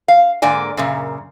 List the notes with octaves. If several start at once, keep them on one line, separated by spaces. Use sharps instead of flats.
F5
G#2 D3 A#3 D5 G#5
F#2 A#2 C#3